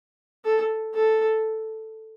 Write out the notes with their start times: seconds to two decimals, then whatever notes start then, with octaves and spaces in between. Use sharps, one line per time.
0.45 A4
0.95 A4